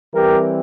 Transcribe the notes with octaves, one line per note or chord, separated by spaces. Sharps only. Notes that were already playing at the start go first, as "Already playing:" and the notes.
E3 G3 C4 G4 A#4